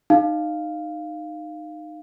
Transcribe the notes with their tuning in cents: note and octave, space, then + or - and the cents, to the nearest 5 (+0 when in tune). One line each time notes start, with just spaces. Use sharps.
D#4 -20 F5 +0